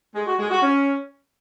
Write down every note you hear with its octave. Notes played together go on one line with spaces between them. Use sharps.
G#3
F#4
G#3
F#4
C#4